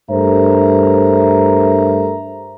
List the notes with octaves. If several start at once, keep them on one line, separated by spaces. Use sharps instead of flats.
G2 A3 A#4 C5 E5 A#5